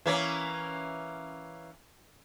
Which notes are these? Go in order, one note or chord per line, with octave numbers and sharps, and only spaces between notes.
E3 A#3 C#4